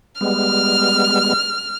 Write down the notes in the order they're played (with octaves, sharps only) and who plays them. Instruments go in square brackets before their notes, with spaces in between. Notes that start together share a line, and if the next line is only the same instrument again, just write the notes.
[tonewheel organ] G3 G#3 B3 [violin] F6